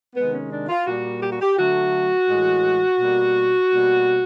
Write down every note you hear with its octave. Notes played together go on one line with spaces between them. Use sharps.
C3 D#3 G#3 B3
C#4
D4
F4
A#2 G3 A#3 F#4
G4
F#4
G4
D3 F#3 A3 F#4
A2 E3 G#3
B2 G3 A#3
B2 G3 A#3